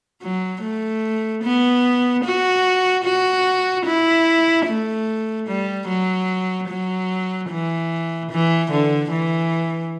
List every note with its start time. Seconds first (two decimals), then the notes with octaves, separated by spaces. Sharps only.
0.22 F#3
0.62 A3
1.43 B3
2.24 F#4
3.04 F#4
3.86 E4
4.66 A3
5.47 G3
5.87 F#3
6.68 F#3
7.50 E3
8.31 E3
8.71 D3
9.11 E3